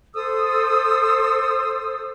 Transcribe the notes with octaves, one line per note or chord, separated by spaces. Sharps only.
A4 C5 D#6 E6